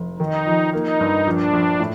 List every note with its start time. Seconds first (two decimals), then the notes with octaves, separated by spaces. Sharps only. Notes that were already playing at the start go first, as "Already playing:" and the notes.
Already playing: F1
0.20 D#3 D#4
0.46 F2
0.73 A#3 D#4
1.00 G2
1.26 A#1 D4
1.53 A#1
1.80 A2